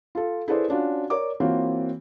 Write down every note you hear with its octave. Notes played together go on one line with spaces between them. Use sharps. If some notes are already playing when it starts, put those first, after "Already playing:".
F4 A4
E4 G#4 A4 B4 C5 D5
C#4 D4 F4 F#4
A#4 C#5 D5 D6
E3 A#3 C4 F4 F#4 C#5